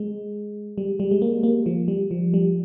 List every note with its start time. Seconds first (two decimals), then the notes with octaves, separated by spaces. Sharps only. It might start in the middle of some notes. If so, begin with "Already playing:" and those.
Already playing: G#3
0.78 G3
1.00 G3
1.11 G#3
1.22 A#3
1.43 A#3
1.66 F3
1.88 G3
2.11 F3
2.34 G3